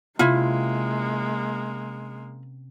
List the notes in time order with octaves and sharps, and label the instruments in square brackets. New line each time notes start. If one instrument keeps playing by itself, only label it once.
[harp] C3 C#4 C7 [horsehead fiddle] G#3 A#3 [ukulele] E4 F4